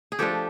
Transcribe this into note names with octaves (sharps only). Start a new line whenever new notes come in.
G#4
F3 A3 D4 G4 A4